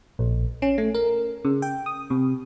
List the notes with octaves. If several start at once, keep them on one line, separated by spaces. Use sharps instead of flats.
A#1
C#4
A3
A#4
C#3
G5
D#6
C3